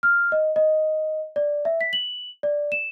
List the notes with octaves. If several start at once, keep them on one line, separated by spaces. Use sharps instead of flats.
F6
D#5
D#5
D5
E5
B6
F#7
D5
E7